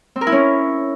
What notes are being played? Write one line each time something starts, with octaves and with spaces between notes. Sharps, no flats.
C4
A#4
E4
C#4